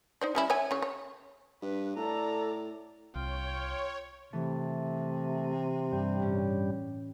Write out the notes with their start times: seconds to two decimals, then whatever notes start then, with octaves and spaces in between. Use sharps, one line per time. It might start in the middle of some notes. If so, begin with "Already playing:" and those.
0.21 D#4 C5 D5
0.35 G3 C#4 E4
0.50 C#5 E5 G#5
0.71 C#3 C#5
0.82 C#5
1.62 G2 B4
1.96 A2 A4 D5 A#5
3.15 C2 F4 C#5 G5
4.33 C3 E3 A3
5.93 G2 G3
6.19 A2 C#4